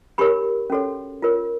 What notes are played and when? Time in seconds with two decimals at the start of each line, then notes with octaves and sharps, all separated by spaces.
0.18 D4 G4 A#4 C#5 B5 C#6
0.70 C#4 F#4 A4 C#5
1.22 F4 A#4 C#5